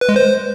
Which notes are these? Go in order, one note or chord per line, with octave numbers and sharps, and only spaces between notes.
B4
G#3
C5